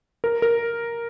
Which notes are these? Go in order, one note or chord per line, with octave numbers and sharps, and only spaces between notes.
A#4
A#4